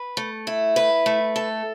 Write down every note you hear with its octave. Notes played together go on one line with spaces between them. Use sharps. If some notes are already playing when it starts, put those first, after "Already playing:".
Already playing: B4
A3
E4
B4
A3
A4